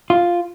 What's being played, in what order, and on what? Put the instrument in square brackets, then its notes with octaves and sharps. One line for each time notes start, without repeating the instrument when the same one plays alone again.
[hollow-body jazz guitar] F4